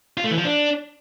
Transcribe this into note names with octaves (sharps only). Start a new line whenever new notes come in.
F4
A3
E3
F3
D4